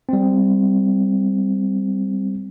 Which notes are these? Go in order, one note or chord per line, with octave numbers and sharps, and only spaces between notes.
G3 C4